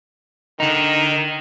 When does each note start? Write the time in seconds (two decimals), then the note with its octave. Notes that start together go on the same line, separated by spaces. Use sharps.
0.60 D3 D#3 D#4